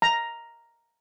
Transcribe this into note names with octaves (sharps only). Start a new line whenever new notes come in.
A#5